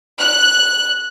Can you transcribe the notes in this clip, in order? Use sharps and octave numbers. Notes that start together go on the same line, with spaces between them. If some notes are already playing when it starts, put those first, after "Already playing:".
F#6